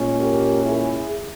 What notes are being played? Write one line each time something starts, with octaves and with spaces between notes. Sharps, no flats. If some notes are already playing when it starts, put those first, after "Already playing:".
Already playing: A#2 G#3 C#4
G4 A#4
E4 G#4